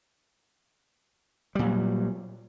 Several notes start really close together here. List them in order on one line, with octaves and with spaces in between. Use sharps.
G3 A#2 F#3